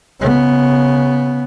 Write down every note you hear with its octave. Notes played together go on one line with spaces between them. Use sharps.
C#3 B3